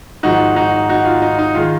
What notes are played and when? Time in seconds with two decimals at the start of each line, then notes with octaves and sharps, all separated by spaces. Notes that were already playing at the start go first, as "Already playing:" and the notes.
0.23 G#1 G#2 F3 D#4 F#4
0.56 D#4 F#4
0.89 D#4 F#4
1.05 F4
1.22 D#4
1.39 D#4
1.55 D#3 G#3 F4